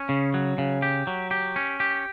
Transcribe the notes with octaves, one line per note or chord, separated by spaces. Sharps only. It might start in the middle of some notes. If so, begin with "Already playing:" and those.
Already playing: C#4
C#3
F#3
C#3
G4
F#3
G4
C#4
G4